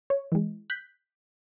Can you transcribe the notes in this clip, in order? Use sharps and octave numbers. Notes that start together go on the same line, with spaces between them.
C#5
E3 G#3
F#6 G6 B6